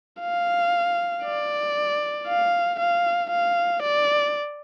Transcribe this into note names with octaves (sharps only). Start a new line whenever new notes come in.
F5
D5
F5
F5
F5
D5